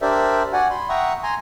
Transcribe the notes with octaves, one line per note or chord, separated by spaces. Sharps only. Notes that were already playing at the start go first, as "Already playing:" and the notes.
D4 G4 A#4 C5 D5 E5
F#4 D5 F#5 G#5
B5 C6
E5 F#5 G5 A#5 C#6 D#6
G#5 A#5 C6